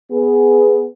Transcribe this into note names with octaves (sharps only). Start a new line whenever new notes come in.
B3 G#4